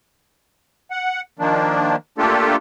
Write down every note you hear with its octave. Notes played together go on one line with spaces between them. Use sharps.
F#5
D#3 F3 A#3 D4
A3 A#3 D4 F4 G4 A4